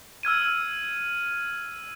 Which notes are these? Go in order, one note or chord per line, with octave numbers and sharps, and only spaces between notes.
E6 F6 G#6 D#7